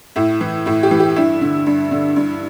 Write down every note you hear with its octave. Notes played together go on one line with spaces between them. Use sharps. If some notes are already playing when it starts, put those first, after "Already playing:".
A2 E4
E3
A2 E4
G4
E3
G4
G2 E4
D3
G2
D3
G2